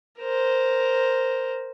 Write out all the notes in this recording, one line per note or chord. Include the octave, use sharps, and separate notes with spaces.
A#4 C5